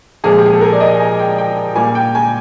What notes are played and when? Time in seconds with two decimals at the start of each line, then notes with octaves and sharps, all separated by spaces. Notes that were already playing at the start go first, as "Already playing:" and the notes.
0.24 A#2 F3 G#3 G#4
0.38 G4
0.46 G#4
0.53 A4
0.61 A#4
0.72 D5
0.80 D#5
1.00 G#5
1.19 G5
1.38 G5
1.76 A#2 G3 A#3 G#5
1.95 G5
2.15 G#5